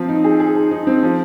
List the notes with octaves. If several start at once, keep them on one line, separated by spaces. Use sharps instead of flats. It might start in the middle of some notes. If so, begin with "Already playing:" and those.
Already playing: F3 C4
D#4
G#4
G#4
D#4
D#4
C4
F3